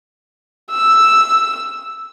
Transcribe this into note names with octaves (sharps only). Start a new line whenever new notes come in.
E6